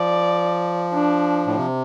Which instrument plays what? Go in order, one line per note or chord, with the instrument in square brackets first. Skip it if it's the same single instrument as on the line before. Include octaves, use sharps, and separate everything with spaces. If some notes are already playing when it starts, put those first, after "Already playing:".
Already playing: [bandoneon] F3 [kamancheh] D5
[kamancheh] D4
[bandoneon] A2
C3